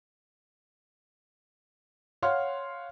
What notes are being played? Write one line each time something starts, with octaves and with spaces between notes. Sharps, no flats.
C#5 F5 F#5 C6 F6